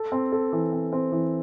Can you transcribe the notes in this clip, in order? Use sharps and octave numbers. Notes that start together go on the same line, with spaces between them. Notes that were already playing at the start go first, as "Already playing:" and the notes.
Already playing: A4
C4
A4
E3
C4
C4
E3